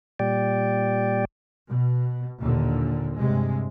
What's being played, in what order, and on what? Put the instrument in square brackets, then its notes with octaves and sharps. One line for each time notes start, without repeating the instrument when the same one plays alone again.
[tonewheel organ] A#2 G3 D5 G5
[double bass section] B2
D#2 A#2 D3
G2 C3 G#3